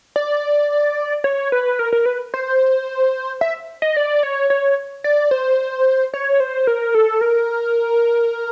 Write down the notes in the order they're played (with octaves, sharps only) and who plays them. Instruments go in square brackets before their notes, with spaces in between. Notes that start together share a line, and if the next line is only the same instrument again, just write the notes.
[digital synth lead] D5
C#5
B4
A#4
A#4
B4
C5
E5
D#5
D5
C#5
C#5
D5
C5
C#5
C5
A#4
A4
A#4